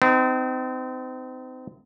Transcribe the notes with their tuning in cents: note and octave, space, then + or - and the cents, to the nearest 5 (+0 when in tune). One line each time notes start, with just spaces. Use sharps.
C4 -35 D#4 +0